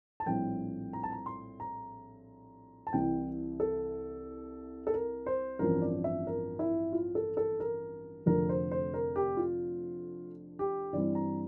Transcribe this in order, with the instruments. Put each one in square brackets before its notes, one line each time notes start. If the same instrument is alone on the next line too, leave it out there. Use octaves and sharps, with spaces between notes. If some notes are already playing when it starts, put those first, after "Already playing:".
[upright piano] A5
A#1 A2 G3 C4 G5
A#5
A5
A#5
C6
A#5
A5
C2 C3 E3 G5
A4
A4
A#4
C5
A1 G2 F3 C4 A#4
D5
E5
A#4
E4
F4
A4
A4
A#4
F1 F2 D3 F3 A3 A#4
C5
C5
A#4
G4
F4
G4
G2 E3 G3 C4 D5
A#5